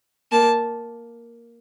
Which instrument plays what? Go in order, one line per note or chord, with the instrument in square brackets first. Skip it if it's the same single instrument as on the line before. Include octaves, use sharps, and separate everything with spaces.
[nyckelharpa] A#3 [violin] A5